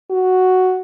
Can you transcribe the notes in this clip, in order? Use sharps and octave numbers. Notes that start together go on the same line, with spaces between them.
F#4